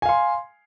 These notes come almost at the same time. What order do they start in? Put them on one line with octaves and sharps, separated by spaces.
G#5 F5 C6